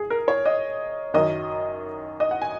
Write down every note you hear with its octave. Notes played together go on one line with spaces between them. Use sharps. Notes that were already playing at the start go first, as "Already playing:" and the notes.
Already playing: G#4
A#4
C#5
D#5
F#2 D#3 F#3 D#5
D#5
F#5
G#5